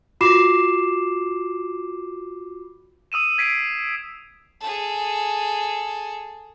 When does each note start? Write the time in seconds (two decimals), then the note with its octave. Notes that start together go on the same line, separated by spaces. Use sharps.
0.21 F4 F#4 B5 D6 C7 E7
3.12 D#6 E6 D#7 E7
3.38 G#6 B6 C7 D7
4.61 G#4 A4